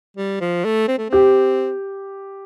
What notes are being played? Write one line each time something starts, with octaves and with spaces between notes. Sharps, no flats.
G3
F3
A3
C4
A3
C4 G4